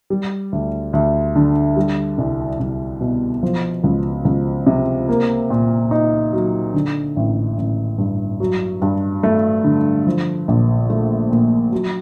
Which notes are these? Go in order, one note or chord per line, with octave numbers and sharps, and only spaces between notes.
G3
D2
D2
D3
G3
C2
C2
B2
F3
C#2
C#2
C3
A#3
A#2
D#4
F#3
D3
A1
A1
G2
F#3
G2
A3
D3
F3
A#1
A3
A#2
F#3